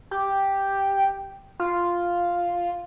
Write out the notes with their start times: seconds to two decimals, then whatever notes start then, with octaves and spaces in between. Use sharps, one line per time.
0.11 G4
1.60 F4